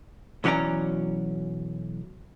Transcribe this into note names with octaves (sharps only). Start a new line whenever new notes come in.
B1 E3 F#3 C#4 D5 A#5